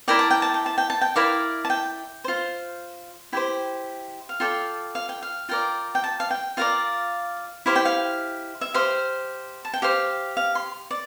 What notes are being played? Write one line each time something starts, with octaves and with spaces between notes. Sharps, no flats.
E4 A#4 D5 G5
A5
G5
A5
G5
A5
G5
A5
G5
E4 A#4 D5 F5
A5
G5
F4 C5
E4 G4 C5 G5
F5
F4 A4 D5 G5
F5
G5
F5
F4 A#4 D5 G5
G5
A5
F5
G5
F4 A#4 D5 F5
E4 G4 C5 F5
G5
F5
E5
G4 C5 F5
A5
G5
G4 C5 F5
F5
C6
D5